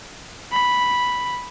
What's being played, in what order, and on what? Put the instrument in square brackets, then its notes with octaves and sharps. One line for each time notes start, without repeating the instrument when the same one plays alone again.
[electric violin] B5